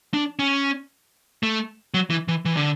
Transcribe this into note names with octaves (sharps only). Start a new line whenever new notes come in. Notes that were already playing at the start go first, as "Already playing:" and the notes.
D4
C#4
A3
F#3
E3
E3
E3
D3